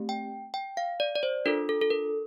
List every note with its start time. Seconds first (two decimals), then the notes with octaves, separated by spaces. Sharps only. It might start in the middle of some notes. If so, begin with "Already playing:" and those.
Already playing: A3 C4 G4
0.09 G5
0.54 G5
0.77 F5
1.00 D5
1.15 D5
1.23 C5
1.46 D4 F4 A4 A#4
1.69 A4
1.81 A4
1.91 A#4